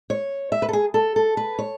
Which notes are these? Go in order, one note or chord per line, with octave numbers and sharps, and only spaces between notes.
C#5
E5
B4
A4
G#4
A4
A4
B4
C#5